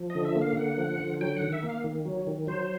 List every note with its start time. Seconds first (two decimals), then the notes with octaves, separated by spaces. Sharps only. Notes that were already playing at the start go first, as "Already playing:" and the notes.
Already playing: F3
0.10 D#5
0.15 D3
0.25 E5
0.36 A#3
0.41 F5
0.57 D3 F#5
0.78 F3
1.00 D3
1.21 F#3 G5
1.37 D#3 F#5
1.53 E5
1.63 A#3
1.69 F5
1.84 D#3
2.05 F#3
2.27 D#3
2.47 F#3 C5